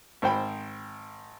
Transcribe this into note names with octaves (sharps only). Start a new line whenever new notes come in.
G#1 C5 G5 B5